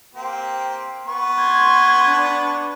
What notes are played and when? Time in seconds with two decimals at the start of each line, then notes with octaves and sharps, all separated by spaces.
0.15 A#3 C4 G4
1.07 B3 C#6
1.39 C6 G#6
2.08 D4